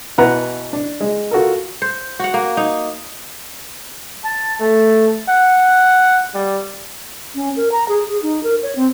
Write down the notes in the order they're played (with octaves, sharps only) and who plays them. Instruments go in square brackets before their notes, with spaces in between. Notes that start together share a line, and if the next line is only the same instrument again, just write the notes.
[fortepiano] B2 E3 B4 F#5 A#5 F#6
D4
G#3
F4 F#4 A4 A#4
[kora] C5
F#4 F#5
A#3
D#4
[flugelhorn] A5
A3
F#5
G3
[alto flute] C#4
A#4
A#5
G#4
G#4
D#4
A#4
C#5
C4